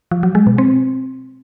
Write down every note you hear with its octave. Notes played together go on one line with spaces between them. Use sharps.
F3
F#3
G#3
B2
C4